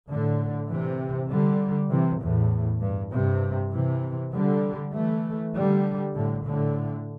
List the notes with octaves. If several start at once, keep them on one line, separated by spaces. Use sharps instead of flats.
A2 D3
C3 E3
D3 G3
C3 E3
E2 A2
G2
G2 C3
C3 E3
D3 G3
E3 A3
D3 G3
A2 D3
A2 D3